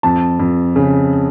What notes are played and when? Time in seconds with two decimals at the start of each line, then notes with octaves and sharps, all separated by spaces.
0.03 F2 A5
0.40 F2
0.76 C#3